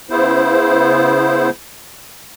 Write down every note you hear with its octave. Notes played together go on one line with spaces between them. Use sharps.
C#3 B3 E4 C5